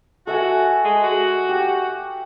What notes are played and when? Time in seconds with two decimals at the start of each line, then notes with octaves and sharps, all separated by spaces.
0.27 F#4 A4 E5 G#5
0.85 G#3
1.04 F#4
1.49 G4